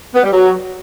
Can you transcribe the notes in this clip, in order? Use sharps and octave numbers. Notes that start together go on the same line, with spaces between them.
B3
G3
F#3